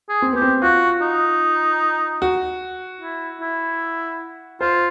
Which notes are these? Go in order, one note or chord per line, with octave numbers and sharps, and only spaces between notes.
G#4
C4
B3 G4
C4
F4 F#4
D#4
F#4
E4
E4
F4 C5